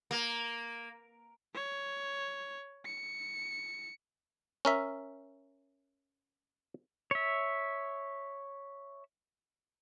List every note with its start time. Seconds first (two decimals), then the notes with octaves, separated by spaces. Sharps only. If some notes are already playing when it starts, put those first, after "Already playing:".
0.11 A#3
1.54 C#5
2.85 C#7
4.65 C#4 A#4 E5
7.11 C#5 E5